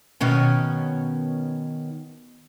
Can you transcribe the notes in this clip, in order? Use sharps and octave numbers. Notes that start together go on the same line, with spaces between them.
B2 D#3 C#4